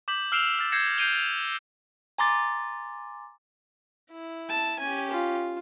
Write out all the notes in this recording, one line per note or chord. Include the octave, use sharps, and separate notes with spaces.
D6 G6 B6 F#7
E6 F6 C7 D7 E7 F7
F6 A6
G6 G#6 A#6 C7 C#7 E7
G6 C7 D7 D#7 F7 G7
A6 F7
G#5 A#5 C6 D6 A6
E4
A5
C#4 G4 G#5
F4